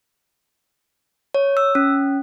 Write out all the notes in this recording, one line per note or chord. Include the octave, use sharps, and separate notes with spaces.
C#5
E6
C#4